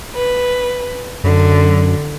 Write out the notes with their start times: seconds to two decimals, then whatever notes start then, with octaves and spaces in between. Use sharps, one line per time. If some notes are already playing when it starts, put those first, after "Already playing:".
0.15 B4
1.24 F#2 D3